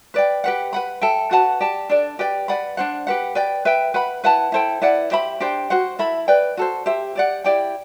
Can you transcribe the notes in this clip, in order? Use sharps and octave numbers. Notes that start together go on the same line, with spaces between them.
B4 D5 G5
G4 B4 F#5
B4 F#5 B5
A4 E5 G5
F#4 B4 F#5 A5
G4 D5 A5
D4 A4 D5
G4 B4 D5 G5
B4 D5 F#5 B5
D4 F#4 C5 F#5
G4 B4 F#5
B4 D5 G5
B4 E5 G5
B4 F#5 B5
E4 B4 F#5 A5
E4 A4 C5 G5
E4 B4 D5 F#5
G4 C5 E5 B5
D4 G4 C5 G5
F#4 C5 F#5
E4 A4 E5 B5
B4 D5 G5
F#4 A4 C5
G4 C5 E5
G4 D5 F#5
E4 G4 D5 G5